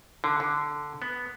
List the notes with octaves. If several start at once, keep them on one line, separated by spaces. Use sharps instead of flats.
D3
D3
B3